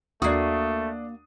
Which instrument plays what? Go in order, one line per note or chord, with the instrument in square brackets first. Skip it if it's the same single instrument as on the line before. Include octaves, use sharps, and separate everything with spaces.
[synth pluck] D#2 C7 [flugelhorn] A3 [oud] A#3 F#4 [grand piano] D4 D#6